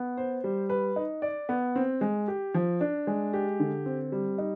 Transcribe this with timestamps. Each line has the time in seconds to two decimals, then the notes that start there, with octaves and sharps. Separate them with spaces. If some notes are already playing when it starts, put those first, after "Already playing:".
Already playing: B3
0.17 C5
0.44 G3
0.70 B4
0.96 D#4
1.22 D5
1.49 B3
1.75 C4
2.01 G#3
2.28 G4
2.54 F3
2.81 D4
3.07 G#3
3.33 G4
3.60 D3
3.86 C4
4.12 G3
4.38 D#4